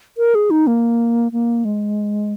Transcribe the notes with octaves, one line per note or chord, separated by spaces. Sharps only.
A#4
G#4
D#4
A#3
A#3
G#3